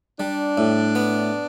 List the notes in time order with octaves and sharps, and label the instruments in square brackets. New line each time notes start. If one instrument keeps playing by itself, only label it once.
[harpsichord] G3 [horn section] D4
[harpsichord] A2
B3